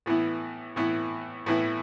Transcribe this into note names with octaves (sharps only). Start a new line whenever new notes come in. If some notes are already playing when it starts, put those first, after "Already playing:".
A2 E3 B3 E4
A2 E3 B3 E4
A2 E3 B3 E4